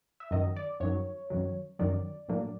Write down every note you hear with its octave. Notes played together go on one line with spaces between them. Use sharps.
E5
F#2 D#3 F#3 D#5
D5
F#2 D#3 F#3 C#5
F#2 D#3 F#3
F#2 D#3 F#3 D5
A2 F#3 A#3 D4